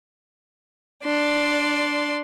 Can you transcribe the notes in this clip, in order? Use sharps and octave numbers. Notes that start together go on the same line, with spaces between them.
D4 D5 C6